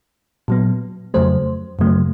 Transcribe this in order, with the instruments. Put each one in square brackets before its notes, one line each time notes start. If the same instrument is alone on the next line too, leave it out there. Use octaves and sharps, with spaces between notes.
[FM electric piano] A#2 F#3 B3
F2 C#3 F#3 A3 C5
F#2 C#3 F#3 A3